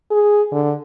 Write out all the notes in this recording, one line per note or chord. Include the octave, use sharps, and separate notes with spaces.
G#4
D3